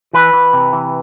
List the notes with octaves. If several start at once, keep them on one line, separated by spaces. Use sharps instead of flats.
E3 B4
E3
C3
E3